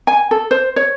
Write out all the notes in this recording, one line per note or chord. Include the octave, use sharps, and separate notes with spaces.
G#5
A4
C5
C#5